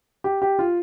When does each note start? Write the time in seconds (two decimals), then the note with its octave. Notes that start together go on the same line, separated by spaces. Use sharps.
0.24 G4
0.42 G4
0.59 F4